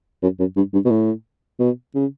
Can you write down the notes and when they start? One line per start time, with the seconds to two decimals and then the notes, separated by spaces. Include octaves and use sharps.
0.23 F#2
0.40 F#2
0.57 G2
0.74 G2
0.85 B2
0.91 A2
1.60 B2
1.95 C#3